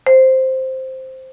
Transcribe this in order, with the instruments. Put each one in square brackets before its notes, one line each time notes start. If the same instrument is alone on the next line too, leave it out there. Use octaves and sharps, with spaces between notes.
[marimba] C5